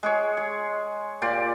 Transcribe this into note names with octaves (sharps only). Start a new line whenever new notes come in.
G#3 G#4 C#5
G#4
A#2 G4 D5 C6